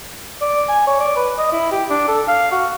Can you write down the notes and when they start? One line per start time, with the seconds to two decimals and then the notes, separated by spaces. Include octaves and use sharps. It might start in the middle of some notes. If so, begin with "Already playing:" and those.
0.42 D5
0.69 G#5
0.87 C#5
1.00 D5
1.16 B4
1.38 D#5
1.52 E4
1.72 G4
1.90 D4
2.08 A4
2.28 F5
2.52 F#4